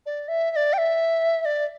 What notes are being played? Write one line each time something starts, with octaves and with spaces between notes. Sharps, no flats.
D5
E5
E5
D5
G5
E5
E5
D5